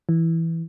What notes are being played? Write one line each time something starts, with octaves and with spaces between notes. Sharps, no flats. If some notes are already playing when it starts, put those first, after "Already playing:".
E3